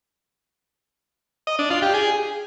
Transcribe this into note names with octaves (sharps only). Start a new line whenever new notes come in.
D#5
D4
F4
G4
G#4